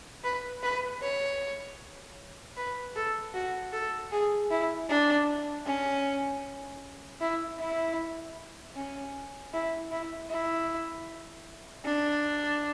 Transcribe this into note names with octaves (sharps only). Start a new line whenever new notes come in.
B4
B4
C#5
B4
A4
F#4
A4
G#4
E4
D4
C#4
E4
E4
C#4
E4
E4
E4
D4